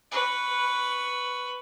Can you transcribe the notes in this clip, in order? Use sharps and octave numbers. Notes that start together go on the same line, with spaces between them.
B4 C#6